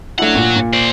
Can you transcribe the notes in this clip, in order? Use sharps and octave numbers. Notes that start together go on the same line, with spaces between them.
A3 D4 E4 C#5 F#5
A#2
A#2
C5 D5